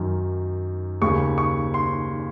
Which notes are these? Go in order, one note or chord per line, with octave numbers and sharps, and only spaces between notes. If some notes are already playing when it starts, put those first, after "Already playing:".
Already playing: F#2 D#3
D#2 C#3 C#6
C#6
C6